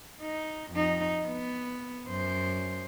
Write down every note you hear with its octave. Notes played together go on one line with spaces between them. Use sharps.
D#4
F2 D#4
B3
F#2 C5